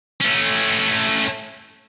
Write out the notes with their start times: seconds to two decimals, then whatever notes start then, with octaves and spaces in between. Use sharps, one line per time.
0.21 A3 C#4